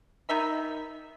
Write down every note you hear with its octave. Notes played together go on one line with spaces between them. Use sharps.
D#3 D#4 E5 B5